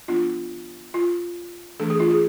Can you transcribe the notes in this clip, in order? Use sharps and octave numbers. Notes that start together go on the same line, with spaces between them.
F3 B3 D4 F4
F4
E3 A3 D4 A4
G#4
F4
G#4